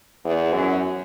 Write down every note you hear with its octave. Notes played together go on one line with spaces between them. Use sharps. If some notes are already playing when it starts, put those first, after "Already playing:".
E2
F#2